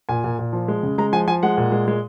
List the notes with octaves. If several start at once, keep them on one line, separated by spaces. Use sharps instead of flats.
A#2 G#5
A#2
A#2
F3
G#3
C#3
G#3 A#5
F3 G#5
F3 G#5
G#3 F#5
A#2
G#3
G#3